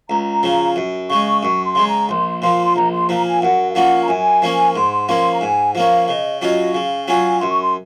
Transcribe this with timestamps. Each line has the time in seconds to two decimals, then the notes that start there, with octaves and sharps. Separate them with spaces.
0.10 C#2 A#5
0.43 C#3 F3
0.76 F#2
1.09 C#3 G#3 C#6
1.42 F#2 C#6
1.65 C6
1.75 C#3 G#3
1.87 A#5
2.09 A#1 C6
2.42 A#2 F3 C6
2.65 C6
2.76 A#1 A#5
2.92 C6
3.09 A#2 F3 A#5
3.25 G#5
3.42 F#2 F#5
3.70 F5
3.75 F3 A#3 C#4 F#5
4.03 A#5
4.08 F#2 G#5
4.42 F3 A#3 C#4
4.75 G#2 C6
5.09 F3 A#3 C#4
5.34 A#5
5.41 G#2 G#5
5.75 F3 A#3 C#4 F5
6.08 C#3 D#5
6.42 F#3 C#4 F4 D#5
6.74 C#3 F5
7.08 F#3 C#4 F4 G#5
7.41 F#2 C6
7.50 C#6
7.61 C6